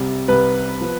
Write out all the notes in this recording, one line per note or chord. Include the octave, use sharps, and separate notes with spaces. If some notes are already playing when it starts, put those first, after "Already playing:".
Already playing: C2 C3 G3
C2 C3 G3 B4
F3 B3